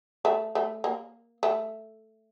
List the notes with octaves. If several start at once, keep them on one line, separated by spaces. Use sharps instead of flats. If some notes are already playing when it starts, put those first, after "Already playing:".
A3
A3
A#3
A3